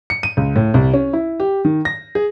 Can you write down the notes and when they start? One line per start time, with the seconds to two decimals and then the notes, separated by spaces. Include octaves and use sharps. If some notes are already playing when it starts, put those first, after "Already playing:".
0.10 C#7
0.23 D#7
0.37 C#2
0.56 A2
0.74 C2
0.94 C#4
1.13 E4
1.40 G4
1.65 D#3
1.85 A#6
2.15 G#4